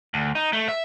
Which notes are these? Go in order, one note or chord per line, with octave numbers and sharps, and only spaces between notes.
D2
D#4
A3
E5